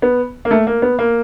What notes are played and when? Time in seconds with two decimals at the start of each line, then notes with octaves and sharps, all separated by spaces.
0.02 B3
0.45 A#3
0.51 A3
0.67 A#3
0.82 B3
0.99 A#3